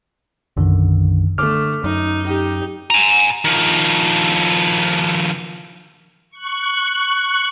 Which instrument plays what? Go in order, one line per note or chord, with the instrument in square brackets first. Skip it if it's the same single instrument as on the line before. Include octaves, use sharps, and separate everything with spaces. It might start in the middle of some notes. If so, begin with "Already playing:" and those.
[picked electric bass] B1 D3 [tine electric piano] F#2 D#3
[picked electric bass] D3 [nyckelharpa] A3 [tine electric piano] D6 F6
[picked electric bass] F#2 [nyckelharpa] D#4
[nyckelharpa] D#4 G4
[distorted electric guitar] G#5 A#5
D#3 F3
[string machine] C#6 F#6